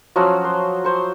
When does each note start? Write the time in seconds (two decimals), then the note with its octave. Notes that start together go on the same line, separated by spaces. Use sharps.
0.16 F3 F#3 C#4 F#4
0.44 C5
0.84 C5 C#5